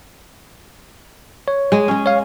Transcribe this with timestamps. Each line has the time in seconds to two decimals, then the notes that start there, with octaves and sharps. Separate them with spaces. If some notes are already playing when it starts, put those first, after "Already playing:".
1.48 C#5
1.72 G#3 G#4
1.88 G#3 C#4
2.06 C#5 F5